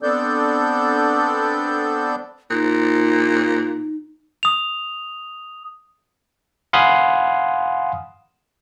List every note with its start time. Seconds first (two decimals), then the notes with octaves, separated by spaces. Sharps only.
0.03 B3 C4 D4 A4 D5 G6
2.51 A#2 D#4
4.43 D#6 F7
6.73 F5 F#5 G#5 B5 C6 D#6